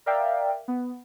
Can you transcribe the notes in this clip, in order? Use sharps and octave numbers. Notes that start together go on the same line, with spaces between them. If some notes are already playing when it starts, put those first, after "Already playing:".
A#4 D5 E5 F5 G5
B3